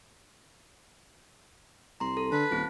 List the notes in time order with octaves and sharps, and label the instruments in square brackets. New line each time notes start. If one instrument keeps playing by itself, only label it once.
[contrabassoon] C2 [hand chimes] A#5 C6
[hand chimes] A4
[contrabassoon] D3 [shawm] B4 [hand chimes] A5
[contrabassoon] D#1 [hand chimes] C4 F4